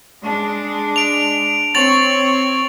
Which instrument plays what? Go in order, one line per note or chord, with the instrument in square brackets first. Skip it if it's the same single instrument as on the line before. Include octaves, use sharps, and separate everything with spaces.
[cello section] G#3 D4
[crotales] D7 F7
[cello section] C4 C#5 [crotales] A6 F7 F#7